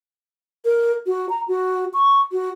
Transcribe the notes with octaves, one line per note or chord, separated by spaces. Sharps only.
A#4
F#4
A#5
F#4
C#6
F#4